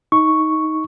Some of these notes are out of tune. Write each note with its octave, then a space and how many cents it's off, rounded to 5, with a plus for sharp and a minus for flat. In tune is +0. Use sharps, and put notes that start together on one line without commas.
D#4 +15 C#6 +0